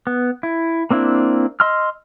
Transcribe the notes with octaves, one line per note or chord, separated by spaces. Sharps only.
B3
E4
A#3 C4 D4 E4
D#5 C6 E6 F6